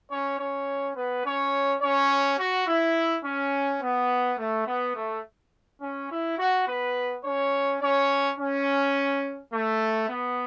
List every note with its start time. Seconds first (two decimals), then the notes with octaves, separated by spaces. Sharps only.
0.12 C#4 C#5
0.40 C#4 C#5
0.97 B3 B4
1.25 C#4 C#5
1.82 C#4 C#5
2.39 F#4
2.68 E4
3.25 C#4
3.83 B3
4.39 A3
4.67 B3
4.96 A3
5.82 C#4
6.11 E4
6.39 F#4
6.67 B3 B4
7.25 C#4 C#5
7.82 C#4 C#5
8.39 C#4
9.53 A3
10.09 B3